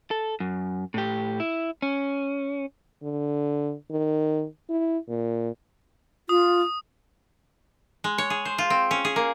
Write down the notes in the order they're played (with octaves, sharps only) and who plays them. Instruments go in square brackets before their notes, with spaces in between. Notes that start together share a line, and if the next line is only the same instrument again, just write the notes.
[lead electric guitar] A4
F#2
A2 G4
E4
C#4
[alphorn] D3
D#3
E4
A#2
[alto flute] F4 [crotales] D#6
[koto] G#3
C#5
G#4
C5
F4
C4
C#4
G#4
A#3